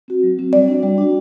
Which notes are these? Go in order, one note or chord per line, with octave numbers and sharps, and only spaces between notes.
C4 F#4
F#3
C4 F#4
G3 D5
D4 F#4
G3
D4 F#4